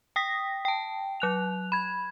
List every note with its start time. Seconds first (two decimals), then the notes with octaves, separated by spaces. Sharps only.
0.16 G5 D#6 A#6 B6
0.65 G5 A5
1.20 F#3 F#6 F7
1.72 B5 G#6